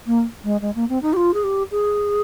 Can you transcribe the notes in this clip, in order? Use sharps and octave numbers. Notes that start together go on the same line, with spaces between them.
A#3
G#3
G#3
A#3
C4
D#4
G4
F4
G#4
G4
G#4